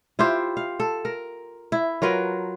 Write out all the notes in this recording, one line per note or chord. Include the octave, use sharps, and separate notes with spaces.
E4 F4 G4 C5
F5
A4
A#4
E4
F#3 F4 A#4 B4